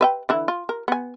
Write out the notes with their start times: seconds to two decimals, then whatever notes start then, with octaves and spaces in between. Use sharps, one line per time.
0.01 B4 E5 G5
0.29 D3 E3 E4
0.48 F4
0.69 A#4
0.88 B3 G#5